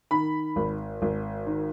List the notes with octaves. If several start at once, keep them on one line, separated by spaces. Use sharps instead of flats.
D#3 B5
G#1
G#1
D#3